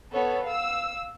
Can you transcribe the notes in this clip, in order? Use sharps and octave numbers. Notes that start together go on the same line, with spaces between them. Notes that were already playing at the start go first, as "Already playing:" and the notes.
B3 A4 C#5
F5 E6